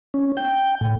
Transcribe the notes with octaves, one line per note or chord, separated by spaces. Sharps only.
C#4
G5
A2